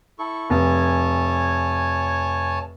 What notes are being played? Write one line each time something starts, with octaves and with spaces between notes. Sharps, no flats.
E4 A4 C#6
F1 C#5 G#5 A5